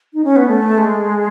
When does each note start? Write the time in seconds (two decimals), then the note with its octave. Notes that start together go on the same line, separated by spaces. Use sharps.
0.14 D#4
0.24 C#4
0.36 B3
0.48 A3
0.78 G#3